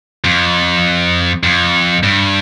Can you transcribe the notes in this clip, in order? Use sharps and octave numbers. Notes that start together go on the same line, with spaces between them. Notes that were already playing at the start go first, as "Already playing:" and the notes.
F2
F2
G2